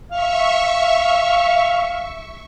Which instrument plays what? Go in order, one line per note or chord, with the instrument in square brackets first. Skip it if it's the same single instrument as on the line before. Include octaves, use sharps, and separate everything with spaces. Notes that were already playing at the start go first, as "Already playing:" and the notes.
[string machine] E5 C#6 [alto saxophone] F5